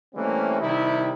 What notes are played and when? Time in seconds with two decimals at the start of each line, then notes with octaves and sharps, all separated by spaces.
0.15 E3 G3 A3 A#3 C4 C#4
0.60 C3 D#3 G3 D#4 E4